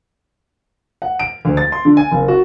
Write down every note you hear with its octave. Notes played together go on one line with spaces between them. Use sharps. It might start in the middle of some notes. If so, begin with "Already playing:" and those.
F#5
D7
D2
A6
C6
D3
G#5
F#1
F#4